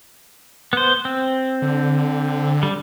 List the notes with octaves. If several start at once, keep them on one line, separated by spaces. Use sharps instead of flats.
B3 C5
C4
D3
G3